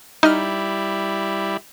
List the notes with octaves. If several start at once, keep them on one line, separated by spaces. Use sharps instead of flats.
G3 D#4 E4 D#5 F6